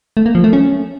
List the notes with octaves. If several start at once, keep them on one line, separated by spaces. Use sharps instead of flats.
A3
A#3
F3
A3
C#4